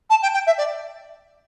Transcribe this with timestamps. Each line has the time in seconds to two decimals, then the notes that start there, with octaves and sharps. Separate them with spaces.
0.10 A5
0.22 G5
0.33 G5
0.46 E5
0.58 D5